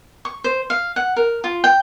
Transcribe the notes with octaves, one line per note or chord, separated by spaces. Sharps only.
C#6
C5
F5
F#5
A#4
F4
G5